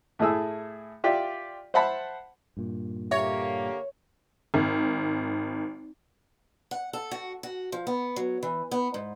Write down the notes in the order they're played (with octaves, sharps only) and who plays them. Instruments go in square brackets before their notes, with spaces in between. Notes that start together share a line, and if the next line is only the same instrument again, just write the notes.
[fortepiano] A2 A3 E4 G#4 E6
F4 G4 D5 E5
C5 E5 F#5 A5 B5
[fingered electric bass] G2 A#2
[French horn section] D3 A#3 G4 [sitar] C#5 [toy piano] E5
[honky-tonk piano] G#1
[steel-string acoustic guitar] F#5
A4
F#4
F#4
F3
B3
F#3
E3
B3
G#2